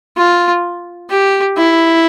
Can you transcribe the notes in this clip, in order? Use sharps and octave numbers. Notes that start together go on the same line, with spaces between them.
F4
G4
E4